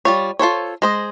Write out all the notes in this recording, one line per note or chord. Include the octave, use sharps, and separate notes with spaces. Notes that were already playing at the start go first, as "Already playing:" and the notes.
G3 F4 C#5
F4 A4 C5 C#5
G#3 C5 D#5